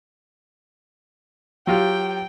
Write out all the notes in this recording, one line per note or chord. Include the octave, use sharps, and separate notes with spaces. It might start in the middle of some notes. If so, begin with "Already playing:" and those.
F#3 F4 G4 G5